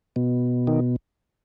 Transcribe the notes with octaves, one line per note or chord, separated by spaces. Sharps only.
B2
D#3